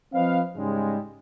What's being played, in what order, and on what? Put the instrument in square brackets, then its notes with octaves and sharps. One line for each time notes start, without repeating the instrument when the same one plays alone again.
[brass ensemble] F3 C4 B4 D#5 F5
G#2 C#3 G3 G#3